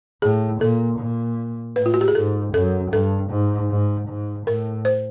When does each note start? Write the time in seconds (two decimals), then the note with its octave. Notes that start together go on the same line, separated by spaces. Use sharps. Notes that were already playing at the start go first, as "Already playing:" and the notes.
0.22 A2 G#4
0.61 A#2 A4
0.99 A#2
1.76 A2 B4
1.86 F4
1.94 F#4
2.01 G4
2.08 G#4
2.15 G#2 A4
2.54 F#2 A4
2.92 G2 A4
3.31 G#2
3.70 G#2
4.09 G#2
4.47 A2 A#4
4.85 C5